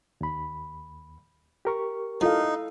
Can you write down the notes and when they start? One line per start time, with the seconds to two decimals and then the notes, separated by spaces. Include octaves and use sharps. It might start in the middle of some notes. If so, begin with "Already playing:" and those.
0.21 D#2 B5
1.65 G4 A#4 C#6
2.21 F3 D#4 E4 A4 F5